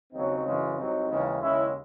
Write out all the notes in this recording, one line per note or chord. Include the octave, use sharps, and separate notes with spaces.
D#2 C#3 F#3 C4 D#4
F#2 C#3 E3 G#3
C2 C3 F#3 C4 D#4
D#2 C#3 E3 G#3
D#2 C#3 G#3 C#4 E4